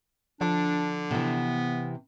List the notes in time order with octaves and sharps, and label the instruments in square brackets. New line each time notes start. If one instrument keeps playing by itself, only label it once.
[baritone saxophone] D3 [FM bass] F3 [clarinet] D4
[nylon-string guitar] C3 E3 [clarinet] B3